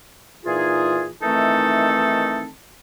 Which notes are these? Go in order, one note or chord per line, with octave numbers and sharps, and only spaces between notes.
A#2 E3 D#4 F4 G#4
D#3 E3 A3 C4 D#4 A4